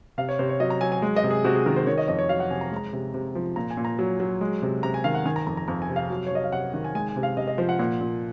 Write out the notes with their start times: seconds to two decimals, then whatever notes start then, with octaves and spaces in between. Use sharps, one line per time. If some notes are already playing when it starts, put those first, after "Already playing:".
0.18 C3 F5
0.29 C#5
0.39 C3 C5
0.49 C#5
0.60 F#3 D#5
0.70 A#5
0.81 F#3 G#5
0.92 G#5
1.02 G#3
1.16 D#5
1.24 C3
1.30 G#4
1.44 C3 F#4
1.56 G#4
1.66 D#3 A#4
1.76 C5
1.87 D#3 C#5
1.98 D#5
2.08 F2 D#5
2.19 C#5
2.29 F#3 F5
2.40 F#5
2.50 C3 G#5
2.61 A#5
2.71 G#3
2.76 A#5
2.93 C3
3.14 C3
3.35 F3
3.56 A#2 A#5
3.71 G#5
3.77 A#2
3.85 A#5
3.99 F#3
4.20 F#3
4.41 G#3
4.62 C3
4.83 C3 A#5
4.94 G#5
5.04 D#3 F5
5.14 F#5
5.26 D#3 G#5
5.36 A#5
5.47 F2 A#5
5.57 A#5
5.68 F2 A#5
5.82 G#5
5.89 C3
5.96 F5
6.10 F#3
6.26 C#5
6.31 C3 D#5
6.44 F5
6.52 C3 F#5
6.74 D#3 F#5
6.84 G#5
6.95 G#3 G#5
7.09 G#5
7.16 C3
7.23 F5
7.37 C3 D#5
7.48 D#5
7.58 F3 C5
7.69 F#5
7.79 A#2 F#5
8.01 A#2